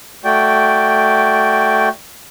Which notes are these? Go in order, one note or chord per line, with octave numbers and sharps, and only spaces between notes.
A3 F#4 D5 G5